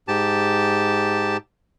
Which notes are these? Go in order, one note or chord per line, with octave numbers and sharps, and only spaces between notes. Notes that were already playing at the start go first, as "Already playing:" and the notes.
G#2 G4 A5